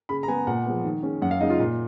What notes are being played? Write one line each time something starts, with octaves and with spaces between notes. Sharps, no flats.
C#3 B5
A#5
G#3 B3 G#5
A#2 F#5
F3 G#3 B3
D#3
G#3 C#4
F#2 F#5
F5
C#3 G#3 D#4 D#5
F4
A#2